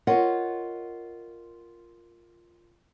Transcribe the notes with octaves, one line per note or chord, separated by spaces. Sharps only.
F4 A#4 C#5 D#5 F#5